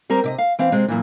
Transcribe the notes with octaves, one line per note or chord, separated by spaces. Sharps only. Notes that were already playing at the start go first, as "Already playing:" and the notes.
G3 C4 A#4 A#5
C3 D5 D#5
F5
E3 C4 F5
C3 G#3 C4
F#2 A#2 E3